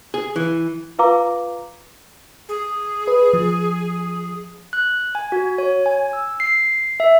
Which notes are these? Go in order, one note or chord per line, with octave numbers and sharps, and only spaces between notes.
G#4
E3
F4 B4 F5 A#5 D6
G#4
B4
F3
F#6
G#5
F#4
C#5
G#5
E6
C7
E5